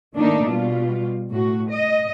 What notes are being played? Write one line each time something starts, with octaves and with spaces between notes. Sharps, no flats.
D#3 A3 A#3 D4 D#4
B2 G3 F4
A2 F#4
D#5